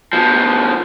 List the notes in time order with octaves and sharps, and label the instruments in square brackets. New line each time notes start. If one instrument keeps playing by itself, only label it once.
[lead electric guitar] B2 F3